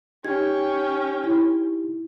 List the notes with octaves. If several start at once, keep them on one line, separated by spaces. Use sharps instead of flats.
C#4 D#4 G4 G5 G#6
E4